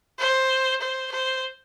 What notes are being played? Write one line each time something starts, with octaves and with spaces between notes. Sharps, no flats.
C5
C5
C5